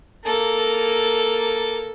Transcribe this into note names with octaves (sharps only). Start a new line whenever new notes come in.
A#3 A4